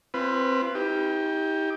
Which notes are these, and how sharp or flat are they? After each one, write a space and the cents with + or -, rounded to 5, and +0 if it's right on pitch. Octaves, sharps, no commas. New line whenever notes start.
C4 +10 F4 -35 B4 +0
D#4 +40 G4 +10